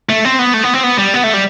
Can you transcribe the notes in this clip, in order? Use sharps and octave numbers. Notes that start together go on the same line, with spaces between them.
A3
C4
B3
A3
B3
C4
B3
G3
B3
A3
G3